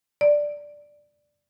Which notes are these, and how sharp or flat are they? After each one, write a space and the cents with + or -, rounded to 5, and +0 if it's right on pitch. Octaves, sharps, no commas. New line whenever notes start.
D5 +0